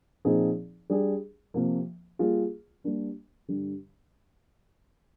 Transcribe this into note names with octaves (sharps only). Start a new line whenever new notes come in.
A#2 F3 C4 D#4 G#4
G3 D4 G#4
C3 F3 A#3
G3 A#3 F4 G#4
G3 A#3 D4
G2 D3 G3